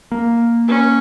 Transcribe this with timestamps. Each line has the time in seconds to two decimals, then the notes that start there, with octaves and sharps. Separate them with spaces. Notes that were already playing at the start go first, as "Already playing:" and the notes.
0.12 A#3
0.68 C#4